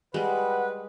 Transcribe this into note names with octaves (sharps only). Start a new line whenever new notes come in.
G3 G#3 B4 F#5